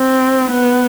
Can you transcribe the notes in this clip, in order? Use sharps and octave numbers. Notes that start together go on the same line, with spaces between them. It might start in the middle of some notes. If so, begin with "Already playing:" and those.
Already playing: C4
B3